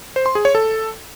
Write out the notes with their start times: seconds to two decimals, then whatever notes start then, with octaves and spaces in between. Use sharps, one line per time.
0.16 C5
0.26 C6
0.35 G#4
0.45 C#5
0.55 A4